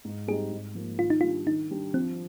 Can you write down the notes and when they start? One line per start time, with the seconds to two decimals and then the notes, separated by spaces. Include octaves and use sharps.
0.05 G#2
0.28 G3 C4 D#4 G#4
0.52 G#2
0.75 F3 A#3
0.99 D#3 F4
1.10 D#4
1.21 G3 D4 F4
1.47 D#3 D#4
1.71 G3 D4
1.94 F3 C4